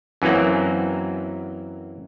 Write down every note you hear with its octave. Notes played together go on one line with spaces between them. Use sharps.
F#2 E3 F#3 A#3 C4